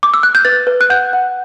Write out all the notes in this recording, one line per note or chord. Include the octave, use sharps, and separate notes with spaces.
D6
E6
F#6
G6
B4 A6
B4
F#6
F#5 G6
F#5